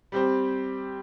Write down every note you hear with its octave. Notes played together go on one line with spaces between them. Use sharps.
G3 C4 G4 C5